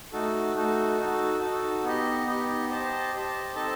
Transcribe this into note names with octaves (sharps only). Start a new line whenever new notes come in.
A3 D#4 F#4 A4
A3 D#4 F#4 A4
D#4 F#4 A4
D#4 F#4 A4
B3 D#4 G4 D#5
B3 D#4 G4 D#5
G4 C5 D#5 A5
G4 C5 D#5 A5
C4 D#4 A4 D#5 A5